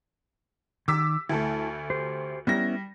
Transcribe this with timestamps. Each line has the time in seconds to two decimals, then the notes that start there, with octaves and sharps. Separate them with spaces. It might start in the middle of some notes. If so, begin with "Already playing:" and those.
0.88 D#3 D6 E6 B6
1.29 D2 A3 E4 A4
1.90 G4 C5
2.47 G3 B3 C#4 E4 A#6